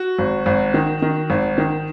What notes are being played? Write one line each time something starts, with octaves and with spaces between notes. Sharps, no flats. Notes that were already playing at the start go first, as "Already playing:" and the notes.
Already playing: F#4
G#1
G#1
D#3
D#3
G#1
D#3